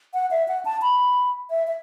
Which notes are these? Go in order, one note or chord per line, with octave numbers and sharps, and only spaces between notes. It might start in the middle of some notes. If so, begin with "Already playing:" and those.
F#5
E5
F#5
A5
B5
E5
E5